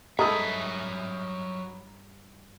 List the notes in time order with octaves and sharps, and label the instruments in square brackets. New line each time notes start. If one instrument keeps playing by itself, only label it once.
[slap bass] G2 [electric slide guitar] F#3 E5 [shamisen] G#3 A4 [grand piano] A#5 B5 D#6